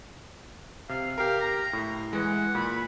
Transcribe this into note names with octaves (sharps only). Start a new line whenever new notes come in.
C3 F5
G4 A#4 F5
A#5
A2
E3 G#3 F#5
A#2 B5